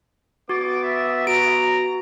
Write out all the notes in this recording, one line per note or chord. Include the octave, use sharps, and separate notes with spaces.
B3 F#4 D6 A6
E5
F#4 A#5 D7